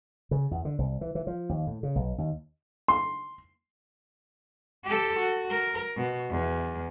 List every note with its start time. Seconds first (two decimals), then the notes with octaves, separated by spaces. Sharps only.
0.31 C#3
0.51 E2
0.65 D3
0.78 C2
1.01 E3
1.15 E3
1.27 F3
1.49 D#2
1.67 A2
1.83 C#3
1.95 B1
2.18 D#2
2.88 C6
4.85 G4 A4
5.20 F#4
5.50 A#4
5.97 B2
6.30 E2